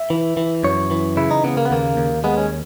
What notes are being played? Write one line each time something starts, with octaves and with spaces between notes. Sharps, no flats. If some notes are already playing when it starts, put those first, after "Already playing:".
Already playing: E5
E3
E3
F#2 C#5
E3
C#3 E4
D#4
C#3 B3
A#3
B3
D#2 A#3
D#2
G#3 B3
C#4